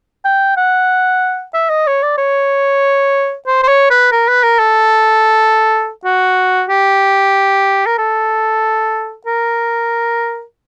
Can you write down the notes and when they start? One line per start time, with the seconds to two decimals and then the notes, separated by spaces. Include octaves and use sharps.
0.25 G5
0.57 F#5
1.54 E5
1.69 D#5
1.87 C#5
2.03 D5
2.18 C#5
3.47 C5
3.63 C5
3.68 C#5
3.90 B4
4.12 A#4
4.28 B4
4.43 A#4
4.59 A4
6.05 F#4
6.69 G4
7.86 A#4
7.98 A4
9.27 A#4